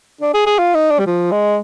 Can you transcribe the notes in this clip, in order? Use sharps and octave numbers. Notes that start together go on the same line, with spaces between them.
D4
G#4
G#4
F4
D#4
D4
G3
F3
G#3